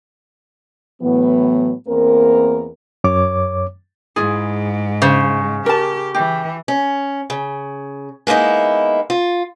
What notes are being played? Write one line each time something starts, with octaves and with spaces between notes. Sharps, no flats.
A2 E3 F#3 B3
E2 A#3 C4 A#4
F#2 C#5 D6
G#2 E4 F4 G#4
C#3 C5
G4 A#4 A5
E3 G4
C#4
C#3
G#3 A#3 B3 D#4 E4
F4